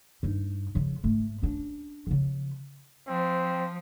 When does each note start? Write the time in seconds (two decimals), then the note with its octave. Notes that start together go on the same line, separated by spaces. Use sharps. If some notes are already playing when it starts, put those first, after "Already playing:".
0.23 G2 D#4
0.75 C#3 F3
1.04 G#2 A3
1.42 C#4 D4
2.07 C#3 F3
3.07 F3 C4